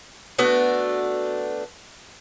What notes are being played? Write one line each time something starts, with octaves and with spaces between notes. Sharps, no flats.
A3 B3 D4 F#4